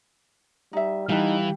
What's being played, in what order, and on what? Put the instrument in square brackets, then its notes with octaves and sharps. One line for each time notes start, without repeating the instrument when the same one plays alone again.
[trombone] G3 [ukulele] D#4 E5
[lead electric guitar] E3 [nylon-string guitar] G3 F#5 [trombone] D#4 [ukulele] F5 A5